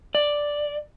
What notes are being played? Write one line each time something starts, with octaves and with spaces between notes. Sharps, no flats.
D5